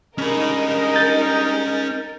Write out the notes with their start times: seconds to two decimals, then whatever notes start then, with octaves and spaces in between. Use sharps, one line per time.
0.18 G2 G#3 C#4 D#4 A#4 D#5 B5
0.96 G6 A6